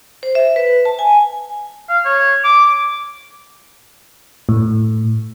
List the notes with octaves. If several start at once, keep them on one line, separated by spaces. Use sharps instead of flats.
C5
E5
B4
A5
G#5
F5
C#5
D6
A2